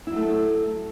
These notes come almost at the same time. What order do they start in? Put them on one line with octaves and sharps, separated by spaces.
E4 F#3 A3 A4